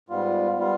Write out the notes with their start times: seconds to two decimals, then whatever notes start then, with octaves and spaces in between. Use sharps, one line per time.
0.09 G#2 G3 B3 F4
0.58 G3 B3 F4